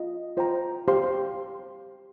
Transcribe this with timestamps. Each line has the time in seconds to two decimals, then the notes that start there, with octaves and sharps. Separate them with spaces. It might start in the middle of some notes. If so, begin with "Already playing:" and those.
Already playing: F4 D#5
0.37 F4 C5 G5 A#5
0.88 G4 C5 F5 C6